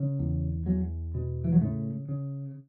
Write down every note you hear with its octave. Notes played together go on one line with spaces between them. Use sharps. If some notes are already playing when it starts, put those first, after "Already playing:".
Already playing: C#3
E2
E2 F#3
B2
E3
F#3
A2 C#3 A3
C#3